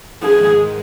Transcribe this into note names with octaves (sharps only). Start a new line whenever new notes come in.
G#2 D#3 G#3 G#4